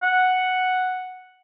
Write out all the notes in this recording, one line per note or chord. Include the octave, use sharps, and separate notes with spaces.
F#5